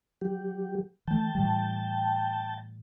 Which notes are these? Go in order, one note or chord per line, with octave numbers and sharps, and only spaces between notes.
F#3 G4
E3 A3 G5 A5
A2 E3 G3